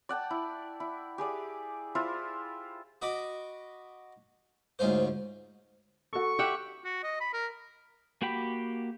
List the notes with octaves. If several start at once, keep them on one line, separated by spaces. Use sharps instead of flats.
D5 F#5 G5 A5
E4
E4
G4 G#4 D5
E4 F4 C5 E5
F#4 D#5 B5 D6
D2 G#2 C#4 F4 C5
F#4 A4 C#6
G4 E5 F#5
F#4
D#5
B5
A#4
A#3 F#4 G4 G5 B5